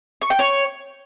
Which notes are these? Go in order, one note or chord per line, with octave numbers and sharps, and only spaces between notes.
C#6
G5
C#5